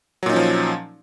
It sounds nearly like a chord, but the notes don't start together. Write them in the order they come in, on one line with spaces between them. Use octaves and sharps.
F#3 A#2 D#4 C#4 F3